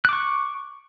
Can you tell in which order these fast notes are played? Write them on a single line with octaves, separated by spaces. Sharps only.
F#6 D6 C#6